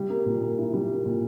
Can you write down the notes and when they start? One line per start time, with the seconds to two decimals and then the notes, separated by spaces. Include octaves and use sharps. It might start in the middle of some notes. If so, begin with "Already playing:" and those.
Already playing: G3
0.10 A#3
0.26 A#2
0.42 A#3
0.58 E4
0.73 G3
0.90 A#3
1.06 A#2